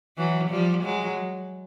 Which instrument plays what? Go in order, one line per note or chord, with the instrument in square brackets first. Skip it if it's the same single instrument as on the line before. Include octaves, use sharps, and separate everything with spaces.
[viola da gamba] E3 F#3
F3 G3
F#3 G#3